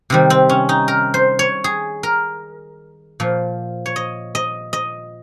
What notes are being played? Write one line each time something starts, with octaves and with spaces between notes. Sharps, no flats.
C3 D#3 G3
C4
C#4
D#4
A#4
C5
C#5
G#4
A#4
A#2 F3
C#5
D#5
D#5
D#5